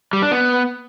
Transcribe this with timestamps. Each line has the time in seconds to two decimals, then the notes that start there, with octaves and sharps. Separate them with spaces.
0.13 G3
0.22 D4
0.31 B3